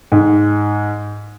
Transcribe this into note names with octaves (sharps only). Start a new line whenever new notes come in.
G#2